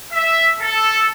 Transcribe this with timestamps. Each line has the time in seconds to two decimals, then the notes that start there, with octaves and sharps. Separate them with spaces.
0.12 E5
0.60 A4